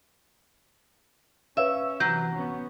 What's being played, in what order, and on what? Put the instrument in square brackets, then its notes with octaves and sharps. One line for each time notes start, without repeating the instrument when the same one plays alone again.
[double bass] C#4 [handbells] B4 C#5 F5 [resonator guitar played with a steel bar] E5
[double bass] C3 E3 [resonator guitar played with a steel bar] F#3 [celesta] G6
[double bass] B3 C#4